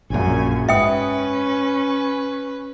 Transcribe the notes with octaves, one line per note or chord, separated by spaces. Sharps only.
A#1 F#2 A#2 C#3 G#5
G#2 C#4 B4 E5 G5 D#6